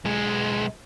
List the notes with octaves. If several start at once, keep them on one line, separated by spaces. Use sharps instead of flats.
B1 G#3